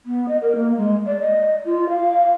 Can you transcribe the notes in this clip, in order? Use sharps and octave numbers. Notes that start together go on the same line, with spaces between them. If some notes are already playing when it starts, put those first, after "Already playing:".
B3
D#5
A#4
A#3
G#3
D5
D#5
F4
F5